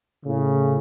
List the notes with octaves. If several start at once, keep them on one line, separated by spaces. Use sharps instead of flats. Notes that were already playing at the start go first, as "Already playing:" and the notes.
A2 C#3